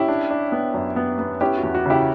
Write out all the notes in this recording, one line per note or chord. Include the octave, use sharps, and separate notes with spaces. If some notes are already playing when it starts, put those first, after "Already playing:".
Already playing: C#4 E4 G4
D4
D4
B3
F#2
B3
B3
C#4 E4 G4
F#4
E2
F#4
C#3 E4 G4